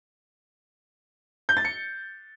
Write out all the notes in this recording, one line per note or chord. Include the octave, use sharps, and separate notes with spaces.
G6
A6
C#7